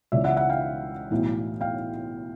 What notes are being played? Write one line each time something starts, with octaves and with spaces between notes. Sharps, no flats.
C#2 C#3 E3 D5 E5
E5 F#5
E5 F#5
F5 G5
B1 A2 E3
F5 G5